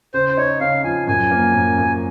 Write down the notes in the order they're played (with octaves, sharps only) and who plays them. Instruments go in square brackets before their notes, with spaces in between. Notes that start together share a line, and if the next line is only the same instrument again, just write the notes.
[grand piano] C#3 [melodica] C5
[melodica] C5
[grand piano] D#4 [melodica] C#5
[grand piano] C#3 [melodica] F5
[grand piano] F3 [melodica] G#5
[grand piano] F#2 [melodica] G#5
[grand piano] A#3
F#2
F#2